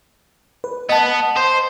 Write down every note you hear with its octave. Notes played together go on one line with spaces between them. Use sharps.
B4
B3 D#5 A5
C5